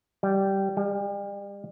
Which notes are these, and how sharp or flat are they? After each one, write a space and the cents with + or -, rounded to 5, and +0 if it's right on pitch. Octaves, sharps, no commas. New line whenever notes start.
G3 -10
G3 +40